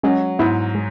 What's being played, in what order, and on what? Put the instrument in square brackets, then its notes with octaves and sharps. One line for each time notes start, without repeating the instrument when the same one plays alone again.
[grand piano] F#3 [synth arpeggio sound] G#3 C#4
[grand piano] G#2 [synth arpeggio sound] B3 E4
[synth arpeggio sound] G#3